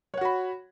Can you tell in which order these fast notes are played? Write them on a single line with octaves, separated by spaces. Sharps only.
C#5 F#5 F#4 B5